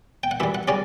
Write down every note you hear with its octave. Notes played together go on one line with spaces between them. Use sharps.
G5
F#5
F#2 E3 G3 E5
F#5
C#3 G3 C#4 D5